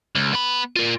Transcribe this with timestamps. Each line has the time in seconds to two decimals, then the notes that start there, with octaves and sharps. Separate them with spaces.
0.15 C#2
0.33 B3 B5
0.76 F4 A#4